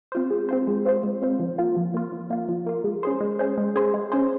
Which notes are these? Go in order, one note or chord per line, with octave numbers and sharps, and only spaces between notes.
C4 F4 C5
G#3
C4 F4 C5
G#3
C4 F4 C5
G#3
C4 F4 C5
F3
A#3 F4
F3
A#3 F4
F3
A#3 F4
F3
A#3 F4
G#3
C#4 G#4 C5
G#3
C#4 G#4 C5
G#3
C#4 G#4 C5
G#3
C#4 G#4 C5